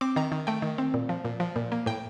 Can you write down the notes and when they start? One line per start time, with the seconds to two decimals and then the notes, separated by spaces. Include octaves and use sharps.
0.01 C4 D6
0.16 D#3 A#5
0.32 D#3
0.47 A3 G5
0.62 D#3
0.78 C4
0.94 A#2
1.09 F3
1.25 A#2
1.40 F3
1.56 A#2
1.72 A#3
1.86 A2 G5